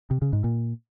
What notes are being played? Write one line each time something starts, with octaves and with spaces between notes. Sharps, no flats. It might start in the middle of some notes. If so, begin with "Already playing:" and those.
C3
C#3
G#2
A#2